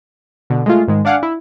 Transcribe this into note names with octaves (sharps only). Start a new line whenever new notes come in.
B2 D3
G#3 A3 F4
G#2 D#3 G#3
D4 D5 F5 F#5 G#5 D6
E4